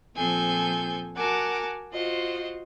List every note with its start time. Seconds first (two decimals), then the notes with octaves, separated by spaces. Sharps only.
0.15 A#2 F3 C4 A4 G#5 G6
1.16 F#4 A#4 F#5 G#5 A5 D6
1.93 F4 F#4 C5 D#5